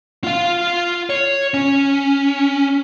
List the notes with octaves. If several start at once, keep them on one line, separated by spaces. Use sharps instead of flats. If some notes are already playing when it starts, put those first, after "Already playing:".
F4 F5
C#5
C#4